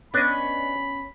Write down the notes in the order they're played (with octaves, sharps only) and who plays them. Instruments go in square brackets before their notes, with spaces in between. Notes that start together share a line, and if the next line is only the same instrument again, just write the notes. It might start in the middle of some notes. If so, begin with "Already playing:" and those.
[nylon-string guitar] B3 C#4 [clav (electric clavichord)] D4 D#5 [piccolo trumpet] B5